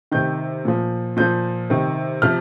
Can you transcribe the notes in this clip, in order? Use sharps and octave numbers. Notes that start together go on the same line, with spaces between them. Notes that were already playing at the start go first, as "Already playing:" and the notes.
C3 D#3 G6
A#2 F3
A#2 F3 G6
C3 D#3
C3 F3 F6